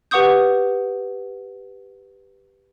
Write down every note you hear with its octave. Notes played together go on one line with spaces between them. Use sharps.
G4 B4 F#5 C#6 D#6 G6